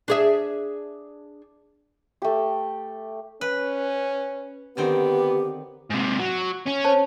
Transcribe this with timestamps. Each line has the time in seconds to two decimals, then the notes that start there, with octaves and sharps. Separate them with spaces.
0.08 D4 G#4 E5
2.22 A3 G4
3.41 C#4 B4
4.77 D3 D#3 B3 C4 G4
5.90 G#2 C3
6.19 F#3
6.66 C#4
6.84 C5 C#5 A5